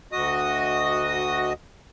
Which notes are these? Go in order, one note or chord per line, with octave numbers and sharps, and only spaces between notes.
D2 F#4 D#5 D#6